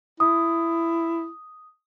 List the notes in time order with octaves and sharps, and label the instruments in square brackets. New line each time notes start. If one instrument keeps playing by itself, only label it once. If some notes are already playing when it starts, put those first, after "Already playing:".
[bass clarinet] E4 [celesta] D#6